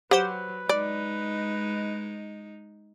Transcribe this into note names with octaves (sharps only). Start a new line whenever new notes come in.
F#3 G4 B4 C5 F#5
G#3 D#4 D5